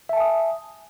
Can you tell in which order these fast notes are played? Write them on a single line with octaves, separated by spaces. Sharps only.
E5 A5 G#5 D#6